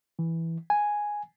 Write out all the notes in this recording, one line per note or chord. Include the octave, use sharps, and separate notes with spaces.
E3
G#5